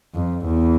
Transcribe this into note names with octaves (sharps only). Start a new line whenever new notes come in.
F2
E2